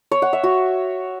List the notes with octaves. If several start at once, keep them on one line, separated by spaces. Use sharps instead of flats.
C#5
F#5
E5
F#4